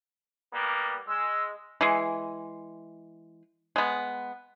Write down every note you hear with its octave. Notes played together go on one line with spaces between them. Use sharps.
G3 A#3 B3
G#3 E6
E3 G#3
G#3 B3